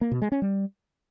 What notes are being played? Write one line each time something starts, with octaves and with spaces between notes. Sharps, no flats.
A#3
B2
G#3
C#4
G3